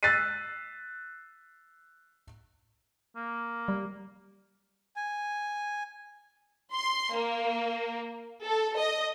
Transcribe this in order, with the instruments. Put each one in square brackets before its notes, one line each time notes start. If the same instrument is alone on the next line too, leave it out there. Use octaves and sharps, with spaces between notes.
[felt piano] E6 F#6 A6 B6 C7 D#7
[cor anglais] A#3
[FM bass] G3
[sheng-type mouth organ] G#5
[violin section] C6
A#3
A4
D#5